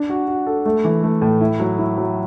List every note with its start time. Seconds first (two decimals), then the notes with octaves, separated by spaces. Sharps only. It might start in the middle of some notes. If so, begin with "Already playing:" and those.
Already playing: D4
0.09 F#4
0.28 F#4
0.47 A4
0.65 A3
0.85 E3
1.03 A3
1.22 A2
1.41 E4
1.60 F#3
1.78 E4
1.97 F#3